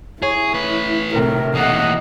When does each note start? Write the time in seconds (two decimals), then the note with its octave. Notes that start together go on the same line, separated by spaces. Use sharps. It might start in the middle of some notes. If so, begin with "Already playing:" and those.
0.22 E4 G#4 C#5
0.54 A3 B4
1.15 B1 A2 C3 A#4
1.55 E3 A#3 D#5 F#5